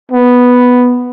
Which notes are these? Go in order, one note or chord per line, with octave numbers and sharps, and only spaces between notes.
B3